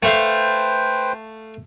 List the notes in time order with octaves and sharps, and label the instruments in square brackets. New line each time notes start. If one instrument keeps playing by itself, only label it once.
[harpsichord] A3 F5 [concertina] B4 C5 G5